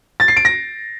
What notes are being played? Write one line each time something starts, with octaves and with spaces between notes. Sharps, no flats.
A6
C7
D7
A#6